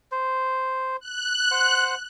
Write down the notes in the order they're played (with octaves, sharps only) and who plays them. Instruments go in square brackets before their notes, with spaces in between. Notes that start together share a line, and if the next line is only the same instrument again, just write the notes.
[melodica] C5
[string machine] F#6
[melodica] C5 F#5